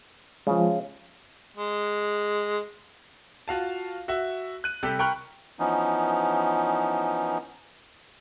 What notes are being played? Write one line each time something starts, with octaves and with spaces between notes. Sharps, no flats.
C#3 F3 G#3
G#3
F4 F#4 F5 A5
F#4 E5
F#6 D#7
C3 G3 G4 A4
A#4 G5 B5 C#6 F6 F#6
E3 F3 B3 C#4 D#4